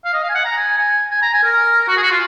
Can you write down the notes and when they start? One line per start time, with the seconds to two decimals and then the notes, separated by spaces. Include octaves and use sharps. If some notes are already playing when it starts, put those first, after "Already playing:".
0.05 F5
0.13 D#5
0.23 F5
0.29 G#5
0.35 F#5
0.45 A#5
0.57 G#5
0.78 G#5
1.11 G#5
1.22 A#5
1.33 G#5
1.43 A#4
1.88 F#4
1.97 G#4
2.03 F#4
2.11 F4